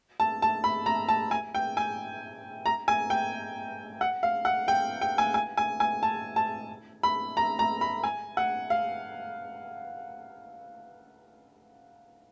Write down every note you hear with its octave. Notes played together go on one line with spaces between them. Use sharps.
A5
A5
B5
A#5
A5
G#5
G5
G#5
A#5
G#5
G5
F#5
F5
F#5
G5
G5
G#5
G#5
G#5
G#5
A5
A5
B5
A#5
A#5
B5
G#5
F#5
F5